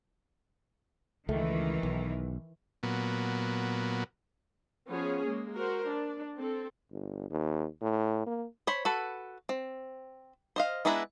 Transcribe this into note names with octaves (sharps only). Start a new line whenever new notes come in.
C#2 D#3 E3 A3
B1
A#2 F#3 B3
F3 B3 C#4 G#4 C#5
G#3 A#3
F#4 A#4 C5
D4
C4 A4
G1
D#2
A2
A#3
C5 C#5 B5
F#4 A4 B4
C4
C5 D#5 F5
G#3 B3 D4 E4 A#5